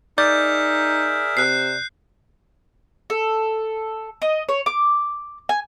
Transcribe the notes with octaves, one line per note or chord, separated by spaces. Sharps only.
D#4 G#4 A#4 D5 E5 G6
C3 F#6 C7
A4
D#5
C#5
D6
G#5